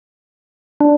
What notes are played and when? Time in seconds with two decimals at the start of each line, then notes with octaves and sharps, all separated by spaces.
0.81 D4